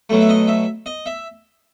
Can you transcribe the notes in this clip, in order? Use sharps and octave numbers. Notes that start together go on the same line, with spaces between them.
B2 F#3 A3
E5
D#5
E5
D#5
E5